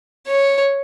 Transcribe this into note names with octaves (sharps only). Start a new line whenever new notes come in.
C#5